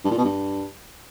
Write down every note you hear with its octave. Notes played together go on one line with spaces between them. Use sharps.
G2
A#2
B2
G2